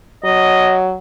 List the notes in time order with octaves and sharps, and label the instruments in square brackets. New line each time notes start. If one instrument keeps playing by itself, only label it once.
[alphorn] F#3 [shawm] D#5